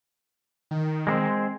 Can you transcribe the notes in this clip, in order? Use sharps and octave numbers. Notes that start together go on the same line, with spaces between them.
D#3
G#3 A#3 C4